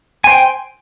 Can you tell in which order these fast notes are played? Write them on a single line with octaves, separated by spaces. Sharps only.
G#5 C5 G5